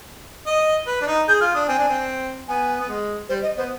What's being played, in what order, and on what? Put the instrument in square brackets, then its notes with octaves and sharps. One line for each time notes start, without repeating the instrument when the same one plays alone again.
[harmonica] D#5
B4
D4
D#4
[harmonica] G#4 [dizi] G6
[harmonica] F4 [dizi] F6
[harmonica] D4 [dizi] D#6
[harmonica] C4 [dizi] G#5
[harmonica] D4
C4
[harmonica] B3 [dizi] G#5
[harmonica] B3
G#3
[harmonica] G3 [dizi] C5
[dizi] D#5
[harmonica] B3 [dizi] C5